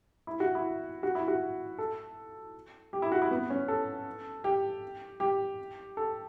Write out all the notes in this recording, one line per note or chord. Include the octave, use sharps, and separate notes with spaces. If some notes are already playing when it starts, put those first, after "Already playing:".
E4
F#4
E4
F#4
E4
F#4
A4
G4
E4
F#4
E4
B3
C#4
A4
G4
G4
A4